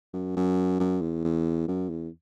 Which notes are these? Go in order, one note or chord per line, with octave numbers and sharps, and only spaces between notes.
F#2
F#2
F#2
E2
E2
F#2
E2